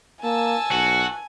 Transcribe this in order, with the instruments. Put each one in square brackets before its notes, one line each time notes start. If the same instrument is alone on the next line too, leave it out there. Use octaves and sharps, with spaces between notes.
[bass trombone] A#3 [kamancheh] G#5 [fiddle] A5 E6
[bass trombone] B1 [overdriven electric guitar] F#4